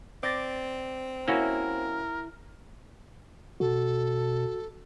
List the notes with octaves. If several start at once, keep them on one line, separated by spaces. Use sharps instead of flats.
C4 D5 A6 A#6
A#3 C#4 E4 F#4 A#4
B2 F#4 A4